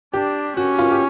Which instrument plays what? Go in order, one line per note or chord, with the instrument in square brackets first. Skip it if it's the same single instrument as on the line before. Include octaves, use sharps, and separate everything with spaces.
[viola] D4 [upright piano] G4
[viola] C#4 [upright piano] F#4
[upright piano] F4
G4